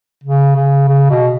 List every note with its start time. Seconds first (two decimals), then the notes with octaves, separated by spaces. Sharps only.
0.24 C#3
0.56 C#3
0.88 C#3
1.10 B2